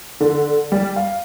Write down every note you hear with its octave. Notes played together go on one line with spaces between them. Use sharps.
D3
G3
F5